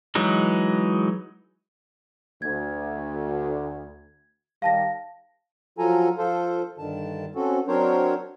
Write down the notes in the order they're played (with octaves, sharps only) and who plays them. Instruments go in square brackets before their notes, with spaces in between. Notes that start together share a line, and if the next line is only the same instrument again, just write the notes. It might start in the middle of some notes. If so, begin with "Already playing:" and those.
[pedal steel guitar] E3 F#3 G#3 D#4
[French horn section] D2 [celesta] G#6
[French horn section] D#3 G3 G4 [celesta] F5 A5 A#6
[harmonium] F3 F#3 F4 A4 G#5 A#5
F3 F4 A4 C5
G2 D3 D#3 A5
C4 C#4 F#4 A4
F#3 C4 D4 A#4 C5 C#5